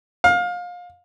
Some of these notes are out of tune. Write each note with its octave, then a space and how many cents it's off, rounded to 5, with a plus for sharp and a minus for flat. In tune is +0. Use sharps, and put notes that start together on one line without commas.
F5 +25